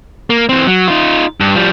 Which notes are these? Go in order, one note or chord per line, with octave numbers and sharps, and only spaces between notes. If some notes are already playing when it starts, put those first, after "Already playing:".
A#3
E3 C4
F#3
D#4 F4
G2
F3 G3